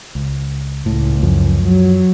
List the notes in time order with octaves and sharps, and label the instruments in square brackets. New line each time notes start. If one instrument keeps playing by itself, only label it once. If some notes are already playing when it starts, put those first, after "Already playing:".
[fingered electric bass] C#2
[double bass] C#2 [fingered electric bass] A2
[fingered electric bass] F#2 F3
[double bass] F#3